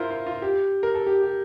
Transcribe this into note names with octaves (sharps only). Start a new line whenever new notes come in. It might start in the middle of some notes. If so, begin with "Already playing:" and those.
Already playing: E4 F4 A#4 C5
F4
F4
G4
A#4
A4
G4
G4